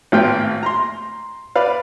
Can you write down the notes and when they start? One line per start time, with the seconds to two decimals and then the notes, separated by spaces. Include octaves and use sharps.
0.12 G#1 A2 B3 F4 G5
0.63 A#5 C6
1.56 B4 D5 F5